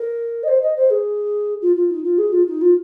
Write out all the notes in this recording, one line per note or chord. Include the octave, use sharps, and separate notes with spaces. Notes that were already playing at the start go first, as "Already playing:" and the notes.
Already playing: A#4
D#5
C5
D#5
C5
G#4
F4
F4
D#4
F4
G#4
F4
D#4
F4